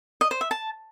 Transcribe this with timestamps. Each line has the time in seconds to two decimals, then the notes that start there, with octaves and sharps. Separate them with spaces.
0.21 D#5
0.31 C5
0.41 E5
0.51 A5